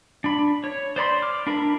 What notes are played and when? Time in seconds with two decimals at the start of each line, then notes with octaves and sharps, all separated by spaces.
0.24 D4 B5
0.64 C#5
0.96 C5 D5 B5 C6
1.22 D6 F6
1.47 D4 E4 A#4 B5